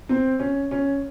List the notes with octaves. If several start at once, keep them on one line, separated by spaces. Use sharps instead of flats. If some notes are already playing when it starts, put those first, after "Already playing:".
C4
C#4
C#4